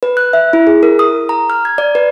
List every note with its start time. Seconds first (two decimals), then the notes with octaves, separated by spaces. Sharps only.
0.03 B4
0.17 F#6
0.33 E5
0.53 E4
0.67 G#4
0.83 A#4
0.99 D#6
1.29 A#5
1.50 F6
1.65 G#6
1.78 D5
1.95 B4